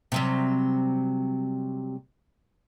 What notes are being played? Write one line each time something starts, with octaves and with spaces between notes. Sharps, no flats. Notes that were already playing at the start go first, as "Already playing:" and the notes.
C3 F#3 G3